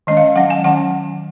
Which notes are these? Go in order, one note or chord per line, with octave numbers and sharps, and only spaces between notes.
D#3 G#3 C#4 D#5
F5
F#3 C#4 F#5
G#5
D#3 F#3 C#4 F#5